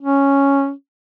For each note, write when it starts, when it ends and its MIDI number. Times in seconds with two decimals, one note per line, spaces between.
0.01 0.71 61